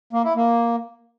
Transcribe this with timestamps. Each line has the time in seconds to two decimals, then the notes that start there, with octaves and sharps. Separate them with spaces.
0.13 A#3
0.24 E4
0.36 A#3